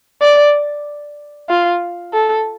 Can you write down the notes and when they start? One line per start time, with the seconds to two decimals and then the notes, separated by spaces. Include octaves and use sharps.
0.22 D5
1.49 F4
2.13 A4